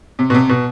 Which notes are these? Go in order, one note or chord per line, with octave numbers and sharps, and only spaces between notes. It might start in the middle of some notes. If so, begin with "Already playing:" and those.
C3
B2
C3
B2